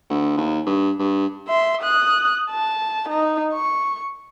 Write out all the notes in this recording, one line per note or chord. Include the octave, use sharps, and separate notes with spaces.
D2
D#2
G2
G2
E5 C6
D#6 F#6
A5
D#4
C#6